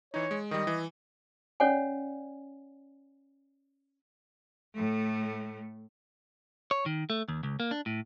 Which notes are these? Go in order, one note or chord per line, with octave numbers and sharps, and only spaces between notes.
E3 D#4 C#5
G#3
D#3 G3 D#5
E3
C#4 C#5 D5 F#5 G#5
A2 A3
C#5
D#3
A3
D#2
C#2
A#3
D4
A2